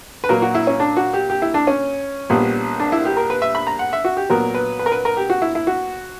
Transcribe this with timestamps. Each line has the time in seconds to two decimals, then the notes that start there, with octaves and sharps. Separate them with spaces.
0.24 B4
0.29 A#2 F#3 A#3 A#4
0.42 F#4
0.55 E4
0.67 C#4
0.80 D4
0.97 F#4
1.13 G4
1.30 G4
1.42 E4
1.54 D4
1.67 C#4
2.30 A#1 A#2 G3 B3
2.80 D4
2.92 E4
3.05 G4
3.17 A#4
3.30 B4
3.42 E5
3.55 B5
3.67 A#5
3.79 F#5
3.93 E5
4.04 F#4
4.17 G4
4.30 A#2 F#3 B3 A#4
4.54 B4
4.79 B4
4.86 A#4
4.92 B4
5.05 A#4
5.17 G4
5.30 F#4
5.42 E4
5.55 E4
5.67 F#4